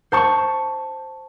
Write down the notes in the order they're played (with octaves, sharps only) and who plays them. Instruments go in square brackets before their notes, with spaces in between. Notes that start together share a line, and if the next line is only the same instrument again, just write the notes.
[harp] C5 A5 C#6